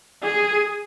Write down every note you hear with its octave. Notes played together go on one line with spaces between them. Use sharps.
G#4